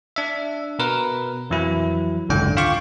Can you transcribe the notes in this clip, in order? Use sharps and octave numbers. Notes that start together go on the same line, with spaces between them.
D4 E5
B2 A#4 B4
F2 E3 F#3 E4
G#1 C#2 F#2 D3 G5
F4 F5 G5 C#6 D6